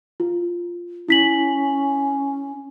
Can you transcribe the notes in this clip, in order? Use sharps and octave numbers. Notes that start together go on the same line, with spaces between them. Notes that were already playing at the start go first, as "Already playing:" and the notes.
F4
C#4 E4 B6 F#7